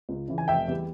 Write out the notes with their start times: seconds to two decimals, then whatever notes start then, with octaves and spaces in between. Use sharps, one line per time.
0.09 C#2
0.28 C#3 E3
0.38 G#5
0.48 F1 E5 G5
0.68 E2 E3 G3